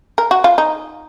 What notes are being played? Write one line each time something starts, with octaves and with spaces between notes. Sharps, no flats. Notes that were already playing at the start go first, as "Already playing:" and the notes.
A#4
F#4
F4
D#4